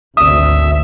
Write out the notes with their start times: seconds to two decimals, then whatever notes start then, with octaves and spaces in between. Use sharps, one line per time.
0.17 G#1 D2 E5 D#6